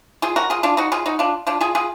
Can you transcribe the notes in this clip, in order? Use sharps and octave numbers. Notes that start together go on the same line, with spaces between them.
F4 G#4
F#4 A#4
F4 G#4
D4 F4
D#4 F#4
F4 G#4
D#4 F#4
D4 F4
D4 F4
F4 G#4
F4 G#4